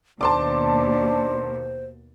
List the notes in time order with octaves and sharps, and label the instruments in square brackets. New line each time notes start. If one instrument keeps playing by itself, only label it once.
[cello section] D#2 B2 [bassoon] D4 [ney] C5 [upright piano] A5 C6 D6